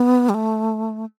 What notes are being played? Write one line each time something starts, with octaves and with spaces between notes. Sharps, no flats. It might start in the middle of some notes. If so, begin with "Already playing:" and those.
Already playing: B3
G3
A3